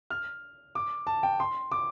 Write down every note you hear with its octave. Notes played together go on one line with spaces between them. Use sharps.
F6
D6
A5
G5
C6
D6